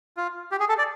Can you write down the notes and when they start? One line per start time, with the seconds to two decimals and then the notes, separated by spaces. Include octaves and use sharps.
0.17 F4
0.51 G4
0.60 G#4
0.69 A4
0.78 D5